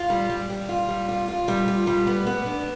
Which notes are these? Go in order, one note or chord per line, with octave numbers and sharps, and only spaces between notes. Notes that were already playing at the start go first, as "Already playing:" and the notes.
Already playing: F4
G3
G3
G3
F4
G3
F4
F4
G3
F4
G3
B3
B3
D4